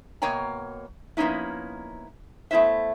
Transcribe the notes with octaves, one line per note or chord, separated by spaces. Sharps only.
B2 A#3 C#5 G5 G#5 A#5
F3 A#3 B3 C#4 D#4 E4
A3 B3 E4 C5 E5